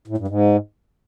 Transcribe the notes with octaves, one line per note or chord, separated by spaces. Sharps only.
A2
G2
G#2